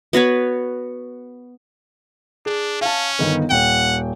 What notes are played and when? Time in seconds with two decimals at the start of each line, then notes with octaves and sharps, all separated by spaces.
0.13 B3 F#4 B4 C#5
2.46 D4 G#4
2.81 C#4 F5 A5
3.19 G1 D#3 B3
3.50 D#1 F#5 G5